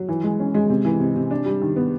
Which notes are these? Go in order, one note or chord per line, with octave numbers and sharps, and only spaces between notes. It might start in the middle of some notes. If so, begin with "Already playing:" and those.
Already playing: F#3
E3
G#3
C#4
G#3
C3
E3
C3
C3
D4
G3
D#3
B3